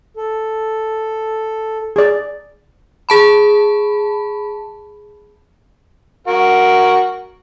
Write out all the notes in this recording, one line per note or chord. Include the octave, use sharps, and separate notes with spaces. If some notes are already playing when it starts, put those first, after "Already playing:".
A4
G#4 D5
G#4 A5 B5
F#4 A#4